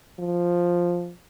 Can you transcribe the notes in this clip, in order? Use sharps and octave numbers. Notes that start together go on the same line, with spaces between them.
F3